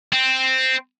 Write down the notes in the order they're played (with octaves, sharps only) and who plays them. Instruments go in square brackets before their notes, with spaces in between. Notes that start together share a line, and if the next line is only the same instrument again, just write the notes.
[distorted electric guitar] C4